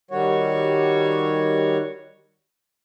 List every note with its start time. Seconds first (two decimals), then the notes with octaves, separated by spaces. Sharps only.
0.11 D#3 G3 F#4 C#5